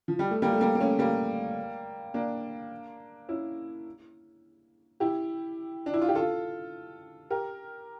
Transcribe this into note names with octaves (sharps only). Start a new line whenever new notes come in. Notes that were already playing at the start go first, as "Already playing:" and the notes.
F3
G3
A3
G3 A#3
A3
G3 A#3
A#3
A3 C#4
G3 A#3
A#3 D4
C#4 E4
E4 G4
D4
E4
F4
G4
F4 A4
G4 A#4